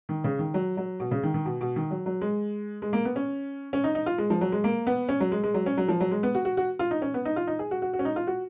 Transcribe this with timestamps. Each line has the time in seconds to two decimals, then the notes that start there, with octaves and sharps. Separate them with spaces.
0.09 D#3
0.24 C#3
0.39 D#3
0.54 F#3
0.77 F#3
1.00 B2
1.11 C#3
1.23 D#3
1.34 D#3
1.45 B2
1.61 B2
1.76 D#3
1.91 F#3
2.06 F#3
2.21 G#3
2.82 G#3
2.93 A#3
3.05 B3
3.16 C#4
3.73 C#4
3.84 D#4
3.95 D#4
4.06 F4
4.18 G#3
4.30 F3
4.41 F#3
4.52 G#3
4.64 A#3
4.87 B3
5.09 C#4
5.20 F#3
5.32 G#3
5.43 G#3
5.54 F#3
5.66 C#4
5.77 F#3
5.88 F3
6.00 F#3
6.11 G#3
6.23 B3
6.35 F#4
6.45 F#4
6.57 F#4
6.79 F4
6.91 D#4
7.02 C#4
7.14 B3
7.25 D#4
7.36 F4
7.47 D#4
7.59 G#4
7.71 F#4
7.82 F#4
7.93 F#4
7.99 C#4
8.05 D#4
8.16 F4
8.27 F#4